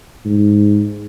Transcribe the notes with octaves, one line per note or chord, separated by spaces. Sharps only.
G#2